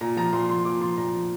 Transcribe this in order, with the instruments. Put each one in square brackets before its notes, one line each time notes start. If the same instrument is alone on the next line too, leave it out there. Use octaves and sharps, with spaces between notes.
[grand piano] A#2 A#5
F3 A#5
A#2 C6
F3 C6
A#2 D6
F3 C6
A#2 A#5
F3